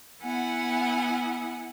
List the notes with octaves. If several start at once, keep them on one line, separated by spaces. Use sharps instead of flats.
B3 E4 F#5 G#5